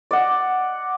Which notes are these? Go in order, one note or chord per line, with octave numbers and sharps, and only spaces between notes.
D5 D#5 F#5